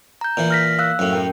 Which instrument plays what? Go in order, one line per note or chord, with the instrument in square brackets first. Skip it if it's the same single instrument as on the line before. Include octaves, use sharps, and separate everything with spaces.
[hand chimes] A#5 G6
[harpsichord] A#2 E3
[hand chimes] F6 A#6 B6
F5 E6 F#6
[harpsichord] F#2 A2
[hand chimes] C#4 A#4 G5